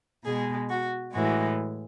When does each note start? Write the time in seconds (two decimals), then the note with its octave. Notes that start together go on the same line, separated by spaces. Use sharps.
0.24 B2 G#3 G#4
0.69 F#4
1.13 A2 E3 G#3 F#4